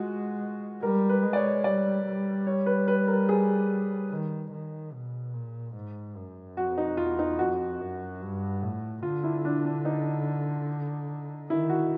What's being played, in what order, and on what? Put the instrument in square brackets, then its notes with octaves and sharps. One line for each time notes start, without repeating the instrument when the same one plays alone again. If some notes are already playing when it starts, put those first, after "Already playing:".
Already playing: [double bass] G#3 [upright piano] F4 F#4
[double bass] G3 [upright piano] A#4
[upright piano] B4
[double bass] G#3
[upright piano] D5
C#5
[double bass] G3 [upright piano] D5
[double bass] G3
[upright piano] C#5
B4
B4
A#4
G#4
[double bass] D#3
D#3
B2
A#2
G#2
F#2
[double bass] F2 [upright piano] F#4
[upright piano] D#4
[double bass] E2 [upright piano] F4
[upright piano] D#4
[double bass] F2 [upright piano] F#4
[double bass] F#2
G2
A2
[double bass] D3 [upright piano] F4
[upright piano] E4
D4
D4
D#4
[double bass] D#3 [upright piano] E4
[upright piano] F#4